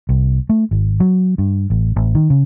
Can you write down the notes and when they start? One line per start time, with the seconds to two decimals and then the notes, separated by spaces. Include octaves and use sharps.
0.09 C2
0.49 A3
0.71 G#1
1.00 F#3
1.38 G2
1.70 A1
1.96 A1
2.15 D#3
2.30 C#3